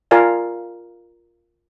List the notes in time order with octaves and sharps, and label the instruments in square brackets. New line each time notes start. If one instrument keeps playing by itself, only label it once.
[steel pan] F4 A#4 D5 F5 G#5 A5